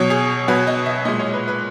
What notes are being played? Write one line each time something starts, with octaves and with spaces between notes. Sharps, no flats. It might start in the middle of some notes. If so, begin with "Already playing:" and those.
Already playing: B2 F#3 C#5
G#4
B2 F#3 B4
D#5
E5
A#2 G#3 D#5
C#5
B4
B4